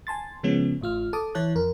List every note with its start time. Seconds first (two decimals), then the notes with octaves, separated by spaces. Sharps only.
0.07 G#5 A5 C6 A6
0.43 C#3 F3 G#3 B3 C#4
0.81 A1 A2 F4 F6
1.13 A4 A5 D6 D#6
1.35 E3 E4 C#5 A5 F#6
1.55 F2 A#4